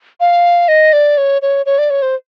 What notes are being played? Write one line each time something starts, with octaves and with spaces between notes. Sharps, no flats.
F5
D#5
D5
C#5
C#5
C#5
D5
C#5
C5